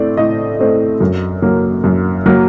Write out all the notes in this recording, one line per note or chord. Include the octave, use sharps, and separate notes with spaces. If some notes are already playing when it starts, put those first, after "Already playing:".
Already playing: A2 A3 C4 D5
A2 D#5
A3 C4
F#2
F#3 A#3
F#2
F#3 A#3